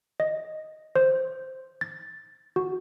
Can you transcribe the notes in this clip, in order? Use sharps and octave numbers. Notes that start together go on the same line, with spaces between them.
D#5
C5
A6
F#4